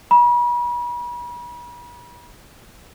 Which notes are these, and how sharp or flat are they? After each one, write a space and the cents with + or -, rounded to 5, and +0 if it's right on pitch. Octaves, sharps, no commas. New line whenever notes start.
B5 -40